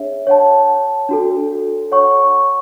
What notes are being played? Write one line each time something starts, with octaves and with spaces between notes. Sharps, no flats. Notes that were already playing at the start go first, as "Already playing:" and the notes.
Already playing: D4 G#4 C#5 E5
C#5 F#5 A5
D4 F#4 A4
C#5 F#5 C#6